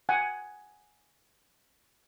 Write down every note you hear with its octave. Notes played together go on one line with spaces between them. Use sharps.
F#5 G#5